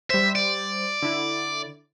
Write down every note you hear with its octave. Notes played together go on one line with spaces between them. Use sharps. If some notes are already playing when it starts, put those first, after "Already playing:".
G3 C5 E5
D5
D3 E4